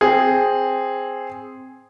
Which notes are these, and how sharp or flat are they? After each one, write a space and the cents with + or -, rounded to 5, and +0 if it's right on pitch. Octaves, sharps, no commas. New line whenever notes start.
C4 +0 G#4 -5